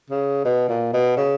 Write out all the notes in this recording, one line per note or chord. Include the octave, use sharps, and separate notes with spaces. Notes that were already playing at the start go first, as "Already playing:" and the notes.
C#3
B2
A#2
B2
C#3